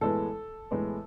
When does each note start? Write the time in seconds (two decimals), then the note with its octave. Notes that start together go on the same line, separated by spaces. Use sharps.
0.01 A2 E3 G#3 B3 A4
0.71 A2 E3 G#3 B3